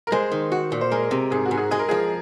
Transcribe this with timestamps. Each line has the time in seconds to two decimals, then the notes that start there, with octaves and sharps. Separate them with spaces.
0.07 A#4
0.12 G#3 C5
0.32 D#3
0.52 F#4
0.72 A#2
0.81 C5
0.92 G#3 A#4
1.11 C3
1.31 G#2 G#4
1.45 F#4
1.51 G#2
1.57 G#4
1.71 G#3 G#4
1.79 A#4
1.89 F3 G#4